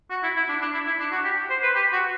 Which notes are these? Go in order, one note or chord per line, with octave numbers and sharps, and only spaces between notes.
F#4
E4
E4
D4
D4
E4
E4
D4
F#4
G4
C5
B4
G4
F#4